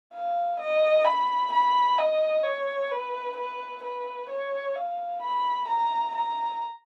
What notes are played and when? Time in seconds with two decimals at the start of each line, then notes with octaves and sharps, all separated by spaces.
0.14 F5
0.60 D#5
1.05 B5
1.52 B5
1.98 D#5
2.44 C#5
2.91 B4
3.36 B4
3.83 B4
4.29 C#5
4.76 F5
5.22 B5
5.67 A#5
6.15 A#5